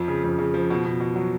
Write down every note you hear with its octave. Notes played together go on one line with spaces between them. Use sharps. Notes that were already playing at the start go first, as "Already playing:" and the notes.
Already playing: F2 F3
C#3
F2
C#3
F3
B2
B2
B2
F#3